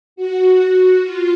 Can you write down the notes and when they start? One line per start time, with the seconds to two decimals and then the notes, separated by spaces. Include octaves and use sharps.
0.16 F#4
1.03 F4